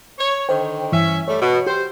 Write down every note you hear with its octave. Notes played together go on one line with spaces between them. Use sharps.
C#5
D3 D#3 C5 G5
G2 E3 C#4 E5
G3 A3 C#5
B2
G4 C5